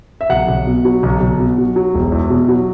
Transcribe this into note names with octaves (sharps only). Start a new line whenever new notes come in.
E5
B1 F#5
B1
B2
F#3
B1
B1
B2
F#3
F#3
E1
E2
B2
F#3